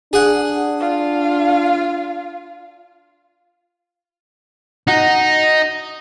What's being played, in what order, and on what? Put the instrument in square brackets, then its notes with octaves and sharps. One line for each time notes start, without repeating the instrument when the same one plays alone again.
[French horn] D4 [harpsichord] G#4 F#5
[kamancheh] F4 F5
[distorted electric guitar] D#4 [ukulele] F#4